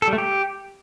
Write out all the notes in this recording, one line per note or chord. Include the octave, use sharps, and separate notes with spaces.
A4
G3
A3
G4